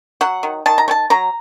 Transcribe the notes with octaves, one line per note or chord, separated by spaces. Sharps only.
F#3 F#5
D#3
D#3 A5
A#5
A3
A5
F#3 A#5